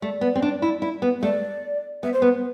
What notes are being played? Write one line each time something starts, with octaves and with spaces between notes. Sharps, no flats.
A3 D5
B3
C4
D4
E4
E4
B3
A3 D5
B3 E5
C5
B3 B4